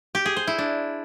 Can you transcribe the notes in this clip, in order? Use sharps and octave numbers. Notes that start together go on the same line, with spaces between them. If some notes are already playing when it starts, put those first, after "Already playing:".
G4
G#4
C5
E4
D4